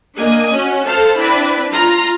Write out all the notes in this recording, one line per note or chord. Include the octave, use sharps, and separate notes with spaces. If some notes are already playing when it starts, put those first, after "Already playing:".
A#3 D4 D#5 G#5
C#4 F#4
A4 C5 F5 A5
C4 D4 E4 B4
F4 F5 A#5 C6